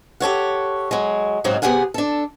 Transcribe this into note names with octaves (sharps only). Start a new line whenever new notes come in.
G4 A4 C#5 F#5
F#3 G#3
G#2 C#3 F#3 G#3 C4
C3 B3 G4 G#4 F#5 G#5
D4 A4